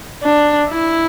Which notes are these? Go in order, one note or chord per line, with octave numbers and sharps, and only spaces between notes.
D4
E4